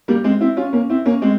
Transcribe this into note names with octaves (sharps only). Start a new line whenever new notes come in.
G3 A#3
G#3 C4
C4 E4
C#4 F4
A#3 C#4
C4 E4
A#3 C#4
G#3 C4